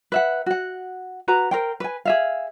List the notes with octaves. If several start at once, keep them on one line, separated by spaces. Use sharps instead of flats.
B4 E5 F#5
F#4 F#5
F#4 B4 A#5
A#4 C5 G5
B4 G#5
G#4 E5 F5